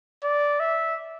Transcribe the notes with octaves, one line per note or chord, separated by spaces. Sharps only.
D5
E5